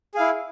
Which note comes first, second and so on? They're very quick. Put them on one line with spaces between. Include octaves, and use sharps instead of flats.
G#4 F5 E4